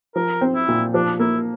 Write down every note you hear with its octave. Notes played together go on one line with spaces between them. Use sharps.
F3 A#4
C4
E4
A#2
F3 D4
A#3 E4